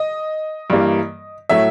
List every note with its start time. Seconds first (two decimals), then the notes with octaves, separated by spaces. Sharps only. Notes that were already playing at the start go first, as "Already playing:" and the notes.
Already playing: D#5
0.70 G2 E3 G3 A#3
1.49 A2 F#3 A3 E5